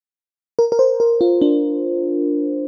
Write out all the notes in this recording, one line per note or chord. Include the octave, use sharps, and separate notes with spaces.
A#4
A#4
C5
A#4
F4
D4